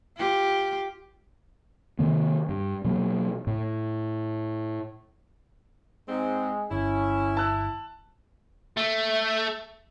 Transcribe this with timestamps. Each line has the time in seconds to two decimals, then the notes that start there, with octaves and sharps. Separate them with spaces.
0.17 F4 G4
1.99 C3 D#3 A#3
2.49 G2
2.84 B2 F#3 A#3
3.47 A2
6.09 G#2 G#3 C4
6.71 G1 C#4 E4
7.37 A5 E6 F#6
8.77 A3